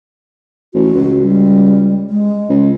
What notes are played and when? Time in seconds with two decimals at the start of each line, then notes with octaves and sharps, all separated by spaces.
0.74 A1 F#4
0.94 C#2
1.22 G3
2.10 G#3
2.49 C#2